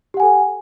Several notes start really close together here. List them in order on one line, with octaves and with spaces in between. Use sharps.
G4 F#5 G#5 A4